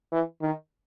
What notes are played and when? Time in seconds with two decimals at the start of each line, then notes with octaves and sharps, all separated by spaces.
0.12 E3
0.42 D#3